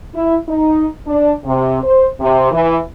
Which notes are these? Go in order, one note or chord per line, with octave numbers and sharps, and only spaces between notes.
E4
D#4
D4
C3
C5
C3
E3